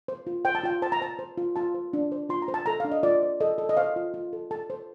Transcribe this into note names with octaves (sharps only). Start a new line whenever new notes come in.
C5
F4
C5 G5
A5
F4 G5
C5 A5
A#5
C5 A5
C5
F4
F4 A5
C5
D4
C5
F4 C6
A#5
C5
A5
A4 A#5
D4 F5
D#5
F4 D5
C5
A4 D#5
A4
D#5
C5 F5
F4
F4
A4
A4 A5
C5